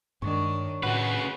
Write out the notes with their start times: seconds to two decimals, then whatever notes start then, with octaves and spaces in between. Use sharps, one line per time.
0.22 G2 D#3 G#3 D4 C#5
0.83 A2 C#3 F#4 B4 F#5